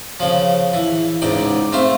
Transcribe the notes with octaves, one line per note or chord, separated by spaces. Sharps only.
C#3 F3
E3
C#2 G#2 D5 G5
A3 C4 C5 F5